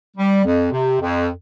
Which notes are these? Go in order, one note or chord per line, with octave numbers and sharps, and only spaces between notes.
G3
F2
C3
F2